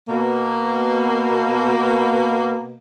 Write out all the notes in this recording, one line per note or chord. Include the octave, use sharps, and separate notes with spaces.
B2 A#3